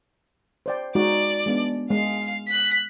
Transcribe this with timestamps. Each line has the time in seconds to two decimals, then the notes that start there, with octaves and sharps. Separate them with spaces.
0.66 C5 D5 G5
0.95 G#3 D#4 F#4 D5
1.46 G#3 B3 D4
1.91 G#3 F5 C7
2.48 F#6 B6